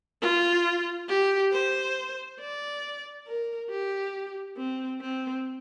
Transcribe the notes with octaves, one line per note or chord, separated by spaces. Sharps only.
F4
G4
C5
D5
A#4
G4
C4
C4